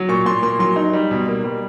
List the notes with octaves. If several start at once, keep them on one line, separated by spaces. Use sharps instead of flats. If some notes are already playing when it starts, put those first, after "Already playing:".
Already playing: F#3
A#2 C#6
A#2 C6
A#3 C6
F#3 C6
D#4
G3
B2
A#3
G3